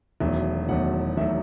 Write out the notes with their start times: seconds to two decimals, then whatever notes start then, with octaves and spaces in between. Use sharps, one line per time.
0.20 E1 E2 D#3 F#3 A3 E5
0.69 E1 E2 D#3 F#3 A3 F#5
1.17 E1 D#3 F#3 A3 E5